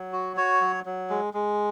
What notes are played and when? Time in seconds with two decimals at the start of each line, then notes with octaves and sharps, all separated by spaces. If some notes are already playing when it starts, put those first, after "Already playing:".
Already playing: F#3
0.13 F#4
0.37 F#4 C#5
0.61 F#3
0.86 F#3
1.10 G#3
1.34 G#3